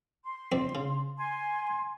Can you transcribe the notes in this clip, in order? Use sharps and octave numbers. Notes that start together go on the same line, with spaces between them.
C6
F2 C4 D5
C#3
G#5 C6